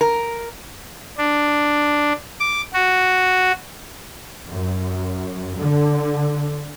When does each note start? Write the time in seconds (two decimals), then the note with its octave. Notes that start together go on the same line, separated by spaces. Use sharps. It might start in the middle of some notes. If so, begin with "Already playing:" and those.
0.01 A#4
1.18 D4
2.40 D6
2.73 F#4
4.49 F#2
5.58 D3